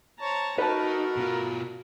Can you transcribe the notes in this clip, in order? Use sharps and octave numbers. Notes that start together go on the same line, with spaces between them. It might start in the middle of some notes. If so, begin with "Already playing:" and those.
C5 C#5 A5 A#5
A3 D#4 F#4 A#4 B4 A5
B2 F4